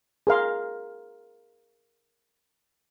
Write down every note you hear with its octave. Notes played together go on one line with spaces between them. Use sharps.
G#4 A#4 F5 C6